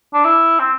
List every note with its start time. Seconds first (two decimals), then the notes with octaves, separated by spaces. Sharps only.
0.14 D4
0.25 E4
0.59 C4